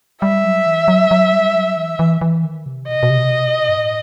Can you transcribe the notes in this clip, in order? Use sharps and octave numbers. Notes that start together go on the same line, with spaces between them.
G3 E5
F#3
E3
F#3
F#3
G3
F#3
E3
E3
E3
D#3
C3
B2 D#5
C3
B2
C3
B2
C3
B2
C3
B2
G2
A2